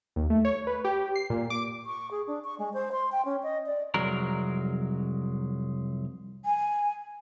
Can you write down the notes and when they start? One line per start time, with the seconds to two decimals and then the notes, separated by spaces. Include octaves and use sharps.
0.16 D#2
0.30 A3
0.45 C#5
0.67 B4
0.85 G4
1.16 C7
1.30 A#2
1.50 D6
1.86 C#6
2.11 G#4
2.27 D4
2.44 C#6
2.59 G#3
2.73 C5
2.92 C6
3.12 G5
3.25 C#4
3.43 D#5
3.66 D5
3.94 C2 F2 F#3 G#3 A#4
6.45 G#5